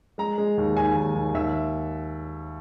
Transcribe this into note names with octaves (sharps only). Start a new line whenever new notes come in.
G#3 A#5
G#3
D#2
D#2 G#5
D#2
D#2
D#2 E5